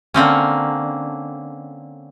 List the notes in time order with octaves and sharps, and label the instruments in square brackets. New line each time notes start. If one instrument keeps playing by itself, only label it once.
[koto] D3 A#3 C4 C#4